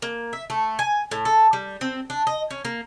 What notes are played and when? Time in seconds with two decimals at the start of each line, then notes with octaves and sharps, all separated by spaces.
0.02 A#3
0.33 E5
0.50 A3
0.79 G#5
1.11 A2
1.25 A4
1.53 G3
1.81 C4
2.10 D4
2.27 D#5
2.51 C#4
2.65 A#3